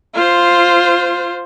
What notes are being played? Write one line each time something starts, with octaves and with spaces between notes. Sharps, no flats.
F4 C5